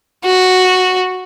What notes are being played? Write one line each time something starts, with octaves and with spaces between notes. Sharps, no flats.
F#4